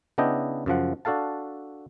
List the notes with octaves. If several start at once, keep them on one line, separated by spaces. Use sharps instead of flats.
C#3 B3 D4 E4 D#5 G5
F#2 C#3 F3 F#5
D4 F#4 A4 F5 A5